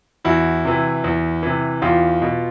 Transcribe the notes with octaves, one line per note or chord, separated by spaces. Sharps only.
E2 E4 F#4
C3 E3
E2
C3 E3
E2 F4 G4
B2